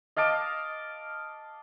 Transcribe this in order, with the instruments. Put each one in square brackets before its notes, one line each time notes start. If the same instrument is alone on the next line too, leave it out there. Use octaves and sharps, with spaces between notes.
[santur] D#5 F5 A5 D6